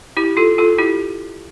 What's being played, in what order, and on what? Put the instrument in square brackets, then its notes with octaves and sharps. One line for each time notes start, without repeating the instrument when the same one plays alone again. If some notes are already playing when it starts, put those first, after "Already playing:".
[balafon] E4 G4
F4 A4
F4 A4
E4 G4